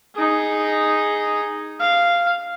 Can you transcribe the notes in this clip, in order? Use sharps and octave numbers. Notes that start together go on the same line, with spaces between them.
D#4 G#4
F5